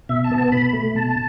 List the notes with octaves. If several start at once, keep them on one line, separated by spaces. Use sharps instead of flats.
B2 E5
A5
B3
A5
B2 B5
A3
B2 A5